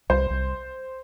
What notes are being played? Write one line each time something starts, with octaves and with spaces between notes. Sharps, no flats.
C2 C5
C2